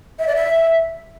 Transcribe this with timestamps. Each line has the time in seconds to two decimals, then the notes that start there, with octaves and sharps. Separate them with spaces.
0.19 E5
0.27 D5
0.35 E5